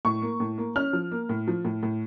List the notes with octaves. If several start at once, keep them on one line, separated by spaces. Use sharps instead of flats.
A2 C#6
A#3
A2
A#3
C#4 F6
F3
A#3
A2
F3
A2
A2